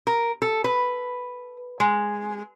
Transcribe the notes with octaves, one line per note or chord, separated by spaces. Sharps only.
A#4
A4
B4
G#3